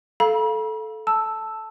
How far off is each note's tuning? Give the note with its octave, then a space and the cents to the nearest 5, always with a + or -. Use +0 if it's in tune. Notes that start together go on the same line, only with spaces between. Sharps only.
A4 -10 F5 +0 B5 -45
A5 +0 E6 +0